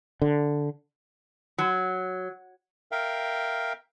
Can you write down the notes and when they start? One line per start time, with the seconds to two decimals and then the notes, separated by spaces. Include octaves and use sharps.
0.22 D3
1.58 F#3
2.92 A#4 E5 F5 G5